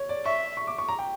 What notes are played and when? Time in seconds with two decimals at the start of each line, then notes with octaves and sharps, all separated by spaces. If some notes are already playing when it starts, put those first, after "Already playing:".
Already playing: C#5
0.09 D5
0.25 E5 C#6
0.57 C#6
0.67 D6
0.78 C#6
0.89 A#5
0.99 G5